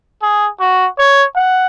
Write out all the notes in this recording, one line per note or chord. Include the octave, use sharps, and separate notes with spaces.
G#4
F#4
C#5
F#5